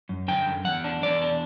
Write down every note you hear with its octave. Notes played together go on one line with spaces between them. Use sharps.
F#2
D3 G5
F#2
E2 F#5
D4
E2 D5
D4